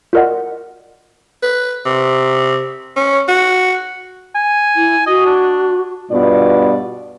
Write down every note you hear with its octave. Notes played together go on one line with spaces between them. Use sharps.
F4 F#4 A#4 D5 D#5 F#5
B4
C3
C#4
F#4
G#5
E4
F#4 D#5
D4
G2 B2 B3 F4 D5